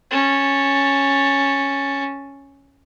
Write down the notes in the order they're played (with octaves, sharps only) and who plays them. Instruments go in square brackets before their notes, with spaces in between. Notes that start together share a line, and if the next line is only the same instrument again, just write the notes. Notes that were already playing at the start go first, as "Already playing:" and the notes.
[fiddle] C#4 A5